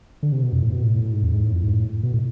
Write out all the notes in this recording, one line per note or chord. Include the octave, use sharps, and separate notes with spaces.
D3
C3
B2
F2
A2
B2
A2
G#2
E2
G#2
A2
F2
G#2
A2
B2
A2